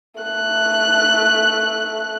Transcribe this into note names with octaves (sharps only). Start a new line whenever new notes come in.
A3 F#6